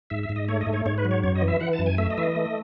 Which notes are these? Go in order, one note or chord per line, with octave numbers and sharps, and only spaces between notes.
G#2 E5
E5
G#2
D#5
A3 C#5
D#5
G#2
C#5
G#2 C#5
B4
F#3
C#5
F#2 C#5
D#5
E3
E5
E3 F#5
A5
F#2
G#5
A3 E5
D#5
E3 E5
D#5
A3